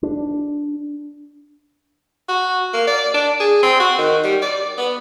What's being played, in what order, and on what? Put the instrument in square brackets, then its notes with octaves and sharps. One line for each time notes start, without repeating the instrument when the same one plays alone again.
[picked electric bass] D4
[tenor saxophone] F#4
A#3
D5
D4
G#4
C4
F#4
D#3
G3
D5
B3